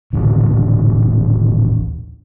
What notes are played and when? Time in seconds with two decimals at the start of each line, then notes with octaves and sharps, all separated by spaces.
0.13 D#1 A1 D3